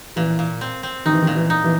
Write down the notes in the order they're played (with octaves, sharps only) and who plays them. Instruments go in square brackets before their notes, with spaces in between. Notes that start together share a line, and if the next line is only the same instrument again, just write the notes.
[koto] A#2 [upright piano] E3
[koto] A#2
C4
C4
[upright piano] D#3 [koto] D#4
[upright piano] E3
D#3
[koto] A#2
[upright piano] E3
[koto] D#4
[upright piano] E3